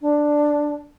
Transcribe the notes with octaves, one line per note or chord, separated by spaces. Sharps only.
D4